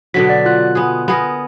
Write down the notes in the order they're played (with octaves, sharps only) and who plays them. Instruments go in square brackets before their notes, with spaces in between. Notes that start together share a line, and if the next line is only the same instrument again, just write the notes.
[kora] B2 D3 F#3 [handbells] B6
[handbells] D5
F4 F#6
[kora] B3 G#4
B3 G#4 A#4